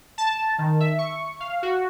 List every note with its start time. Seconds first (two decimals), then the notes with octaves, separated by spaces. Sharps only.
0.18 A5
0.58 D#3
0.80 E5
0.98 C#6
1.40 F5
1.63 F#4